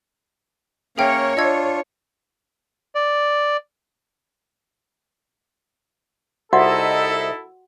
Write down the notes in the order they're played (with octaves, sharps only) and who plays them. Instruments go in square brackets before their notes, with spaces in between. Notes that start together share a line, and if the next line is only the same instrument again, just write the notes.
[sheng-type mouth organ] A#3 C#4 A#4 [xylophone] G#4 E5 G5 [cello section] C#5
[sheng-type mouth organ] D4 F4 [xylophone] D#5 E6 G#6
[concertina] D5
[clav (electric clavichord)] C2 [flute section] D#4 D#5 E5 [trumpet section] E4 A4 [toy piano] F#4 F#5